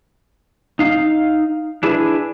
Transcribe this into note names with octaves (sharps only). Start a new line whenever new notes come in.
D#4 F5
D4 E4 G#4 B4